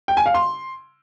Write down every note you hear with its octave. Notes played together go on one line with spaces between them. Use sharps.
G5
G#5
F5
C6